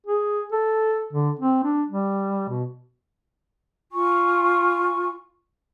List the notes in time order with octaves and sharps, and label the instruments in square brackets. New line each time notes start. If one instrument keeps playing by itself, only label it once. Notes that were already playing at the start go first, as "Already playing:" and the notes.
[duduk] G#4
A4
D3
C4
D4
G3
B2
[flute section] F4 G#5 C#6